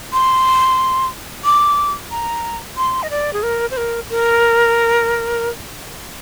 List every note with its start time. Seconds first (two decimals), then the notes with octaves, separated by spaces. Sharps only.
0.13 C6
1.45 D6
2.11 A#5
2.77 C6
3.03 D#5
3.10 D5
3.33 G#4
3.43 A#4
3.71 C5
3.77 A#4
4.10 A#4